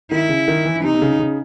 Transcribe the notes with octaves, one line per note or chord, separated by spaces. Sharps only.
D#3 E4
C#3
D#3
E3
C3 D#4
C3
C#3
C#3